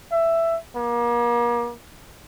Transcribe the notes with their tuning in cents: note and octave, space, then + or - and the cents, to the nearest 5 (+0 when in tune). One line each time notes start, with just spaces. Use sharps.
E5 +10
A#3 +35